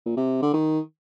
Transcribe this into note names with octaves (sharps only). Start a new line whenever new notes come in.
A#2
C3
D3
D#3